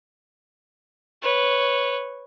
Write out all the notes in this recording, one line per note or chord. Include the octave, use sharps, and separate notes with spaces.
B4 C#5